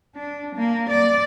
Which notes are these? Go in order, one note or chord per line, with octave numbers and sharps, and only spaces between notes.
D4
A#3
D5